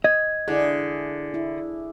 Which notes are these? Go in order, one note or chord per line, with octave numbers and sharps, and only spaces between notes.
D#5 G#6
D3 E4 G#4
E4